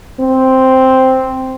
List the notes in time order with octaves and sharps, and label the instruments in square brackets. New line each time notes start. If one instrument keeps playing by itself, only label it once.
[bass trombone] C4